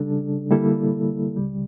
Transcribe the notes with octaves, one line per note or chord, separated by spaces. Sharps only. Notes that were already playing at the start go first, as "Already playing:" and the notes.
Already playing: C#3 G3 D4 A4
D3 G3 A#3 E4 A4
C#2 C#3 G3